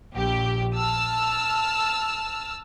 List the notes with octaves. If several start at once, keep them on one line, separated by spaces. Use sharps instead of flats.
A#1 G4
A5 E6 F6